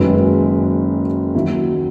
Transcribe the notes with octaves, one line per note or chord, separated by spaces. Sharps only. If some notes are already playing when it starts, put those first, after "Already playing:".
Already playing: F#1 F#2 D#3 G#3 B4
G#4
D#2 D#3 F#3 E4